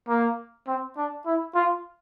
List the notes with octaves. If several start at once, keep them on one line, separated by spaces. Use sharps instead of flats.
A#3
C4
D4
E4
F4